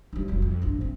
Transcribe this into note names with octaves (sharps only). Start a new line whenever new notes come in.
G3 D#4
F1 F#2
F2
A1 G2
C4